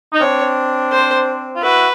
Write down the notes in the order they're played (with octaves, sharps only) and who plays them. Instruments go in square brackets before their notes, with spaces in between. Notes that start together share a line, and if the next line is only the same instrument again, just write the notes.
[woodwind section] D#4
[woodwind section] C4 D4 [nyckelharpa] C#5
[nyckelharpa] C5
[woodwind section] F4
[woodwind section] E4 F#4 [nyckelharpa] B4